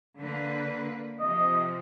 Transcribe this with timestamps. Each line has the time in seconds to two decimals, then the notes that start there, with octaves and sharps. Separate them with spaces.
0.18 D3 A#3 B4
1.20 C3 F3 D#5